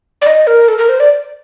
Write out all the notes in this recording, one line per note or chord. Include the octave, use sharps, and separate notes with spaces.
D5
D#5
A#4
A4
A#4
C5
D5